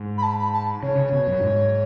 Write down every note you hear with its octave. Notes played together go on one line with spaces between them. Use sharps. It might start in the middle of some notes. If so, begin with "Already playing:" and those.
Already playing: G#2
B5
A5
B5
A5
C#3 C#5
C#3
B2
F#2
G#2